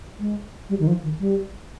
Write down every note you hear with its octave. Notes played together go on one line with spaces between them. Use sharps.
G#3
G3
D#3
F3
D#3
G3